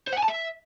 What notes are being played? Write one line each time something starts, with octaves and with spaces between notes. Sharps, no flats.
C5
F#5
G#5
A5
E5